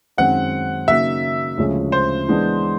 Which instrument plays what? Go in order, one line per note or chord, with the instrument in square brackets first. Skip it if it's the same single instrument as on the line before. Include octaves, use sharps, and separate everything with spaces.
[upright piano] F#2 D#3 G#3 C4 [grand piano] F#5
[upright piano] C#3 F#3 A#3 D#4 F#4 [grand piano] E5
[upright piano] D2 C#3 F3 G#3 C#4
[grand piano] C5
[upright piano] E3 G#3 B3 D4